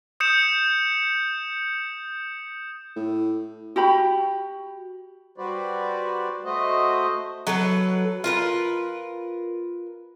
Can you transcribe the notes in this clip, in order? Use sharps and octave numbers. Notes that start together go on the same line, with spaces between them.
D#6 G6 C#7 E7
A2
F#4 G4 B5
G3 F#4 B4 C5 D5
A3 F#4 C5 D#5
F#3 A4 B4
F4 A#4 B4